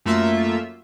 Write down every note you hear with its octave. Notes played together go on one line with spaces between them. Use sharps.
F#2 A3 A#3 F4 E5